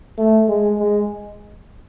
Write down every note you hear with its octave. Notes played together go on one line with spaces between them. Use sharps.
A3
G#3
G#3